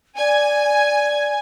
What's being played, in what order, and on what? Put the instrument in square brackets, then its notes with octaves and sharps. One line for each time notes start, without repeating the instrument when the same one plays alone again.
[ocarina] D5 [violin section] G#5